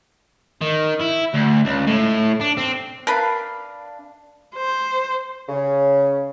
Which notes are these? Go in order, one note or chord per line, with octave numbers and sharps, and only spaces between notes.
D#3
E4
D2
C#2
A2
D4
C4
D4 A#4 B4 F5
C5
C#3